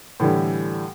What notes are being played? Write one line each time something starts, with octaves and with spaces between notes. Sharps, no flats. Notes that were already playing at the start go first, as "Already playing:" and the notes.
A2 D3 E3 G3